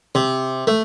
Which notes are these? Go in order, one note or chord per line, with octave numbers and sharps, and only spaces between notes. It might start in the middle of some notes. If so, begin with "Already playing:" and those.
C3
A3